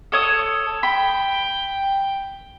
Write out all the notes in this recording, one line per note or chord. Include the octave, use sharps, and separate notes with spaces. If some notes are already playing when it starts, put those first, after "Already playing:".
A4 C#5 D#6
G5 B5